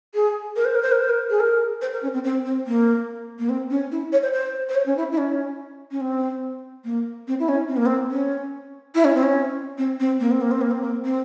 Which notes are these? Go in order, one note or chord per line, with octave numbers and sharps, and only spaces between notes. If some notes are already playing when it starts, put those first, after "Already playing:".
G#4
A#4
C5
A#4
C5
A#4
C5
A#4
G#4
A#4
C5
A#4
C#4
C4
C4
C4
A#3
A#3
C4
C#4
E4
C#5
C5
C5
C5
C#5
C#4
E4
E4
C#4
C#4
C4
A#3
C4
E4
C#4
C4
A#3
C4
C#4
E4
C#4
C4
C#4
C4
C4
A#3
C4
A#3
C4
A#3
C4
A#3
C4